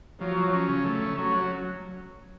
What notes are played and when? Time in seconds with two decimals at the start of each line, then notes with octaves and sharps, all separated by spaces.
0.20 F3 F#3
0.37 F3
0.53 C#4
0.68 C#3
0.85 A3
1.02 C#4
1.17 F#3 C#4
1.34 F#3